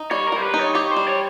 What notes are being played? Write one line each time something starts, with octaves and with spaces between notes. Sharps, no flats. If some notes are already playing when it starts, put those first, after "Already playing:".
Already playing: D#4
G3 C#5
A#4
G3 C5
B4
D#4
C#5
G4 C#5
C5
G3
C#5